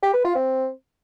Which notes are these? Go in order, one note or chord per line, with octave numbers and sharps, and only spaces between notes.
G4
B4
F4
C4